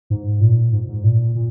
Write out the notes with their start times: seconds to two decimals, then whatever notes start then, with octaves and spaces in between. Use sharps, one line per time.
0.10 G#2
0.41 A#2
0.73 G#2
0.88 G#2
1.04 A#2
1.35 A#2